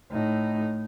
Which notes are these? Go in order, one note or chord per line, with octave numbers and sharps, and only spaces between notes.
A2 D#4